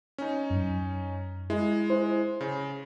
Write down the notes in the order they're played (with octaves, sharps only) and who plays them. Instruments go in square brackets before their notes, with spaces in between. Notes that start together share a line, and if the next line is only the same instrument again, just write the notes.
[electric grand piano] C#4 D#4
[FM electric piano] F#2
[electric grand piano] G#3 [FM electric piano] E4
[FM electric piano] E4 C5
[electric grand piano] C#3